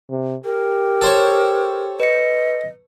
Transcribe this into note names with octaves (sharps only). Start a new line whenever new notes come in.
C3
G4 A#4
A4 C5 C#5
B4 D#5 C#7